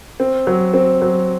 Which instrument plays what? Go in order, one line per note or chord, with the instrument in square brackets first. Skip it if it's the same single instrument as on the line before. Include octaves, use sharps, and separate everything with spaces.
[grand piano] C4
F#3
C4
F#3